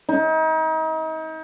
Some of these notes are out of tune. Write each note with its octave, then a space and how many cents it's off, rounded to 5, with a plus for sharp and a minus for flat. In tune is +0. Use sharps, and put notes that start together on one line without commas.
D#4 +35